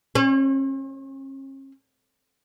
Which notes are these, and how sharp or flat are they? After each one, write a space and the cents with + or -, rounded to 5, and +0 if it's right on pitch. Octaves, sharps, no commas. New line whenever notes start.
C#4 -45